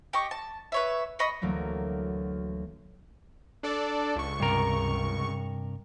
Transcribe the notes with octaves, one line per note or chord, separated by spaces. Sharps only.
G4 D#5 C#6
A5
B4 C#5 E5
D#5 B5 C#6
D2 E3 F#3 A#3
D4 A4 D5
C#2 C#6
G2 C3 A#4